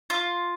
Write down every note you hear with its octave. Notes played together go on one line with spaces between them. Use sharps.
F4